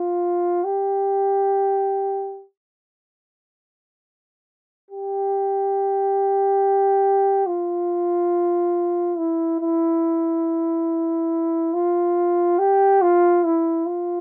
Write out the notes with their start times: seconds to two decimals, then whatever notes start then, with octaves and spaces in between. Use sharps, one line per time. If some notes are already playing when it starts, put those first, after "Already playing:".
Already playing: F4
0.64 G4
4.91 G4
7.47 F4
9.17 E4
9.60 E4
11.73 F4
12.59 G4
13.02 F4
13.44 E4
13.86 F4